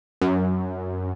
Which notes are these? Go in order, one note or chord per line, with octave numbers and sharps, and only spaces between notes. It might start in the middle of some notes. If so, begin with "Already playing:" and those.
F#2